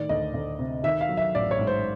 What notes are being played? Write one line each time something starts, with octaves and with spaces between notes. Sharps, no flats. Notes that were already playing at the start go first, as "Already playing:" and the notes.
Already playing: A2 D#3 D5
D2 D#5
D2
C3
D#3 E5
F5
F#3
E5
A1 D5
C#5
G#2
C5